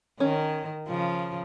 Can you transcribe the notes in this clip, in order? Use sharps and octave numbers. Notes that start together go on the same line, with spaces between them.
D#3 C#4
C#3 F3